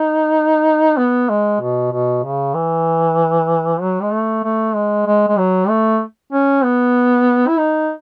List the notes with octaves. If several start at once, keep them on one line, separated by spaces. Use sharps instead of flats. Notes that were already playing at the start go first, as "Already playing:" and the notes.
Already playing: D#4
B3
G#3
B2
B2
C#3
E3
F#3
G#3
A3
A3
G#3
G#3
G#3
F#3
A3
C#4
B3
E4
D#4